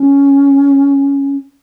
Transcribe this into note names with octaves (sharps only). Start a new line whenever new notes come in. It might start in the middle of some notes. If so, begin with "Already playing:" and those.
Already playing: C#4